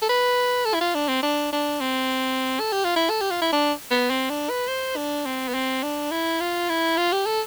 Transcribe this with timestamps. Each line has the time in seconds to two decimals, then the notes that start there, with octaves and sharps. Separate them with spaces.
0.02 A4
0.09 B4
0.66 A4
0.74 E4
0.81 F4
0.95 D4
1.08 C4
1.23 D4
1.53 D4
1.81 C4
2.60 A4
2.72 G4
2.84 F4
2.96 E4
3.10 A4
3.21 G4
3.31 F4
3.42 E4
3.52 D4
3.91 B3
4.10 C4
4.30 D4
4.49 B4
4.68 C5
4.96 D4
5.26 C4
5.48 B3
5.54 C4
5.83 D4
6.11 E4
6.40 F4
6.69 E4
6.97 F4
7.13 G4
7.26 A4